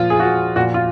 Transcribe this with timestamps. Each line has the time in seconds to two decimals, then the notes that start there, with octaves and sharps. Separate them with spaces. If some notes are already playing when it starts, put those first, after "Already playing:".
Already playing: A#2 F3 F4
0.10 G#4
0.20 F#4
0.56 A#2 F3 F#4
0.74 F4